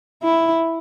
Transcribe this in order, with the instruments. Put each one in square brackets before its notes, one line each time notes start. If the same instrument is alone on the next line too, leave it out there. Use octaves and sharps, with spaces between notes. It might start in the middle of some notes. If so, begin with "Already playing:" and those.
[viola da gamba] E4